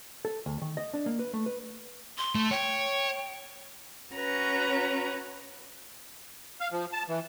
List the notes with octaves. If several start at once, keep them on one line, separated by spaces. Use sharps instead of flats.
A4
D2
D#3
D#5
D4
A#3
B4
A3
B4
C6
A3
C#5 G5
C#4 F#4 B4 C#5 A#5
F5
F3
A5
E3